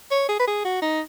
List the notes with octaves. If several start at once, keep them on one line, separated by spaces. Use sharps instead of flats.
C#5
G#4
B4
G#4
F#4
D#4